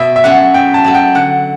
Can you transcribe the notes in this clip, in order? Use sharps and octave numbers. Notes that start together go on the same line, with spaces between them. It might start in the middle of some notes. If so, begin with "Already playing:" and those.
Already playing: B2 E5
E5
F#3 C#4 F#4 A4 F#5
B2 G5
A5
F#3 C#4 F#4 A4
G5
D3 F#5